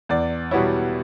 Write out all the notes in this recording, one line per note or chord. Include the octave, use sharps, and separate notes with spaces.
E2 D5
B2 G3 B3 E4 C#5